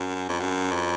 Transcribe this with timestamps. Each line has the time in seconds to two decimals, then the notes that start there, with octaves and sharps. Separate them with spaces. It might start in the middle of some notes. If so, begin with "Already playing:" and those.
Already playing: F#2
0.29 F2
0.40 F#2
0.71 F2